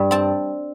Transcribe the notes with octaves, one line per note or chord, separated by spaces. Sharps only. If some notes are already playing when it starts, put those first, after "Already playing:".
Already playing: G2 G3
C4 A5